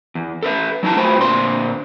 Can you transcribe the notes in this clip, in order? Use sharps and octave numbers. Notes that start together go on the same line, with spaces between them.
E2
A4 B4 E5
F#3 D#4 E4 A5
A3 F4 F#4 B4 C5 G5
A#2 D3 C4 C6